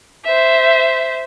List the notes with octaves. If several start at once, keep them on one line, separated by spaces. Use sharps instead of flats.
C5 E5